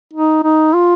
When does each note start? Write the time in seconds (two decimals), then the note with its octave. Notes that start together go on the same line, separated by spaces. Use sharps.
0.13 D#4
0.43 D#4
0.74 F4